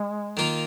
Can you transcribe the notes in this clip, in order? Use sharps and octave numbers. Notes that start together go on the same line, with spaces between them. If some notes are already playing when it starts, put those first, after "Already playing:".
Already playing: G#3
D#3 A#3 F4